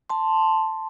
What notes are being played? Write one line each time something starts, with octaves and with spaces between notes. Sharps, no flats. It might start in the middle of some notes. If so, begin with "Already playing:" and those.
A5 C6